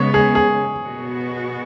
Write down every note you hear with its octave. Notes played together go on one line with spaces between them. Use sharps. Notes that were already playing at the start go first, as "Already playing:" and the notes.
Already playing: C#3 G#3 B3 C#5
G#4
G#4
B2 B3 F#4